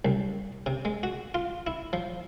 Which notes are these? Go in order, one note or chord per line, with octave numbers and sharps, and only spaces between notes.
C2
C3
G#3
F#4
F4
E4
F3